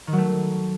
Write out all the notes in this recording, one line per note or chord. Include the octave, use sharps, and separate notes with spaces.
D#3
F#3
A3